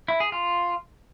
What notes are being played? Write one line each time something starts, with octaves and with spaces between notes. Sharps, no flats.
E4
G#4
F4